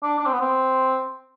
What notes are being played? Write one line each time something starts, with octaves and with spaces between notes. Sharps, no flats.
D4
D4
C4
B3
C4